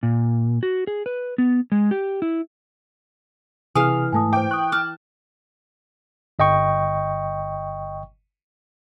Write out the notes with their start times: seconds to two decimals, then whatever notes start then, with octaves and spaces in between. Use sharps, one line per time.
0.03 A#2
0.63 F#4
0.87 G#4
1.06 B4
1.38 B3
1.72 G#3
1.91 G4
2.22 E4
3.75 C3 E3 G#4 F5 G#5 D#6 F6
4.13 G#2 A3 G#5 A5 D#6
4.33 C5 G5 D6
4.51 C#6 D#6 F#6
4.72 A5 D6 F6
6.39 G1 D#5 G5 C#6